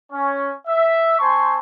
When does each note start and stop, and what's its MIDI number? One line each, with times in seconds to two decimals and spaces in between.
0.12 0.52 61
0.67 1.19 76
1.19 1.58 60
1.19 1.58 72
1.19 1.58 80
1.19 1.58 81
1.19 1.58 84
1.19 1.58 85